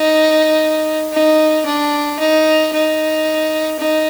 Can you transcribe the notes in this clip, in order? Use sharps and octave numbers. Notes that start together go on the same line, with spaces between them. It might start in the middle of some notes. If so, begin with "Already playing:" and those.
Already playing: D#4
D#4
D4
D#4
D#4
D#4